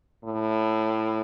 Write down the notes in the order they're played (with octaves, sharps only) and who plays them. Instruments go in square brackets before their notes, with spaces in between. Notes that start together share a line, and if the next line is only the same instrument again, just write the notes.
[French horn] A2